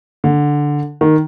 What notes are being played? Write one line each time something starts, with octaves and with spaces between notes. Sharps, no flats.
D3
D#3